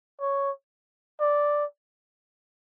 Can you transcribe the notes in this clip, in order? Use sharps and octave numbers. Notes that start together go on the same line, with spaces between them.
C#5
D5